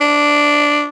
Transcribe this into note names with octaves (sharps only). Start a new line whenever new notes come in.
D4